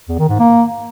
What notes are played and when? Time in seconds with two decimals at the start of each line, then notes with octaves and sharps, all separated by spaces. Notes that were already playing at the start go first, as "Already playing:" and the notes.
0.09 E2
0.19 D#3
0.29 G#2
0.39 A#3